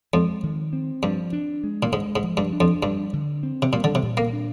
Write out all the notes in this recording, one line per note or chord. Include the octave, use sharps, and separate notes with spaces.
F2 G#3
D#3
C4
G2 F3
D4
G#3
A#2
G#2 G#3
G#2
F3
G2
D4
F2
G2 G3
D3
C4
C3
A#2 G3
D3
C3
A#2
A#3
D4